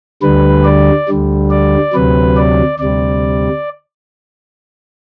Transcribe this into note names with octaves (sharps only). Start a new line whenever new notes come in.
D2 D3 G3 B4
D5
D2 D3 G3
D5
D2 C3 F#3 B4
D5
D2 C3 G3 D5